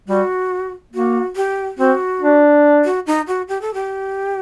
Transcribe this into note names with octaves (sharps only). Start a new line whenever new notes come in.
G3 F#4
A#3 F#4
G4
C4 F#4
D4
F#4
D#4
F#4
G4
A4
G4